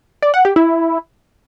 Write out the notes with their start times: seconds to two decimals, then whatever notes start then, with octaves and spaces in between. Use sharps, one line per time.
0.22 D5
0.34 F#5
0.45 G4
0.56 E4